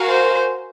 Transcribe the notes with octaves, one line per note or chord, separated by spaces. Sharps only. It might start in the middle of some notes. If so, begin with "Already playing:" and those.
Already playing: F#4 A#4 F5 G#5
C5